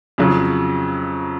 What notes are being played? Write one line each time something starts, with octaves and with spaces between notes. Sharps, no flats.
F2 C#3 F#3